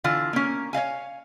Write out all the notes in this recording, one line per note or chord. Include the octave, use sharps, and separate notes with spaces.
D3 E3 F4
A#3 C#4
C#5 D#5 F5 G#5